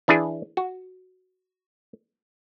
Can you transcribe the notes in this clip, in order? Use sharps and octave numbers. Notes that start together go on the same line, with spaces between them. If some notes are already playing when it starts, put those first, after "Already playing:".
E3 D4 E4 G#4
F#4